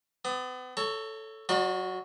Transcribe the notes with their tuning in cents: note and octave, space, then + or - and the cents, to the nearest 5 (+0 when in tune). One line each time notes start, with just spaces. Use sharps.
B3 +40 D#6 -40
A4 +0 C#5 +10 A#5 -40
F#3 +0 F4 +45 D5 +45